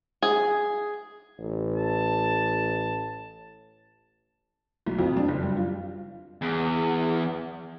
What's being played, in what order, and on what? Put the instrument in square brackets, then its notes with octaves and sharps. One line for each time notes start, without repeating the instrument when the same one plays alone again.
[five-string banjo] G#4
[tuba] A1
[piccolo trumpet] A5
[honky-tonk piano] B1
F2
D4
F#1
G3
F4
[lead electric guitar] E2